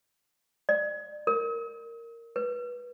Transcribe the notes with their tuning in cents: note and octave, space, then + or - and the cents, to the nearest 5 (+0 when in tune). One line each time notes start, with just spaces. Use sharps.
D5 +30
A#4 -10
B4 -20